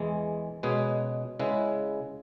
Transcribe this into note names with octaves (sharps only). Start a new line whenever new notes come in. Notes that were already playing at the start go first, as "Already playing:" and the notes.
Already playing: E2 E3 G#3
B2 G#3 C#4 G#4 B4
C#3 G#3 E4 B4